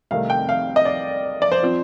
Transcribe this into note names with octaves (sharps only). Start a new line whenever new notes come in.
C2 C3 D#3 A3 F5
G5
F5
D#5
D5
D5
C5
F3 C4